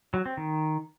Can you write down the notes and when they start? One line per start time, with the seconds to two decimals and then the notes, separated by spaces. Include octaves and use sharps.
0.14 F#3
0.26 C4
0.37 D#3